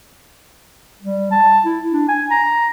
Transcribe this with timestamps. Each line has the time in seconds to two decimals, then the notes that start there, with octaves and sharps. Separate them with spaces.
1.02 G3
1.31 A5
1.65 E4
1.92 D4
2.09 G#5
2.31 A#5